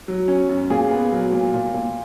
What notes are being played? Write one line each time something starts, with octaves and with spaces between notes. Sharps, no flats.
F#3
C#4
F#2
A#2 G#4
B3
F#3
A#2
A#2
A#2